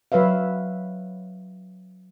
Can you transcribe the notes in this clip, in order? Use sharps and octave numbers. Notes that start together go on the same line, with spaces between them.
F#3 B4 C#5 E5 F5